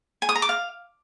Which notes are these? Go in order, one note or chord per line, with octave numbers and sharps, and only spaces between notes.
G#5
D#6
A#5
D6
F5